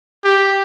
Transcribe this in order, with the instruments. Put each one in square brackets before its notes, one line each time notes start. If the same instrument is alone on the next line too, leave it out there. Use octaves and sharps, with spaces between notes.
[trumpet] G4